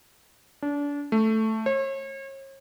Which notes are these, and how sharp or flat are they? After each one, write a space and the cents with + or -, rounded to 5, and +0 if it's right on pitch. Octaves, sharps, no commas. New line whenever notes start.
D4 -30
A3 +0
C#5 -40